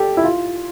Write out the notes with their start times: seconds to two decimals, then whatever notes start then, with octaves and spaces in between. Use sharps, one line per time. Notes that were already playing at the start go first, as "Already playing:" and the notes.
Already playing: G4 A4
0.17 E4
0.24 F4